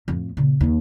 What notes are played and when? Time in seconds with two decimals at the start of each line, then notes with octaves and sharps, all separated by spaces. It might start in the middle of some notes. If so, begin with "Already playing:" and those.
0.08 F2 A2
0.37 A#2 C#3
0.61 D#2 D#4